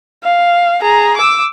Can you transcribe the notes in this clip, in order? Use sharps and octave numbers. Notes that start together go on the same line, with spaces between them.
F5
G#4 A#5
D6 E6